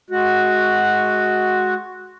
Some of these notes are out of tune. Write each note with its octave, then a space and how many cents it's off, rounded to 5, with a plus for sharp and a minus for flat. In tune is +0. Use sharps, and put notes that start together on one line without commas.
G#3 +20 F#4 +0